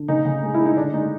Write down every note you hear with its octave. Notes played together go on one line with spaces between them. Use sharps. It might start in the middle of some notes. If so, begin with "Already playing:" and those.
Already playing: D3
C#3 D#4
C#3
G#3
E4
G#3
D#4
D3 D4
G#3 D#4